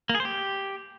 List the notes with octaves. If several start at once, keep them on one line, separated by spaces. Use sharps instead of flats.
A#3
G#4
C5
G4